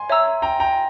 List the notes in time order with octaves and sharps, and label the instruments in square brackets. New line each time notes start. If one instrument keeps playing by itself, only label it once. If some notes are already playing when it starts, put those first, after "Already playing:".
Already playing: [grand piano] G#5 C6
[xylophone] C#5 E5 A#5 E6
[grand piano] G5 A#5
G5 A#5